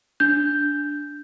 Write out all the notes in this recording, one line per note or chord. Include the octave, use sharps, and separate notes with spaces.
D4 G6